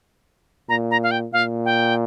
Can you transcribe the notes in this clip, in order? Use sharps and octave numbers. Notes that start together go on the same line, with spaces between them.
A#2 A#5
A#5
F5
G5
A#2 F5
G5